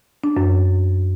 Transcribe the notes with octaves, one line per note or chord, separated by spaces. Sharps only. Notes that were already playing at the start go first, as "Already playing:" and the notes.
D4
F#2